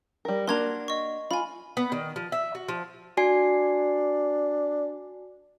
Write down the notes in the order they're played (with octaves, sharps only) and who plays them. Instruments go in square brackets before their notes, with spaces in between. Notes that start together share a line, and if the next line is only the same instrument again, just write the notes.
[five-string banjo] G3 A#4
[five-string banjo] A#3 D4 F#4 [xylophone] C6 G#6 F7
[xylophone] D#5 C#6
[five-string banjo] F4 [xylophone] G#5 B5
[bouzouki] B3
D#3
F3
E5
F#4
F3
[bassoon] D4 [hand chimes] F#4 G#5 C7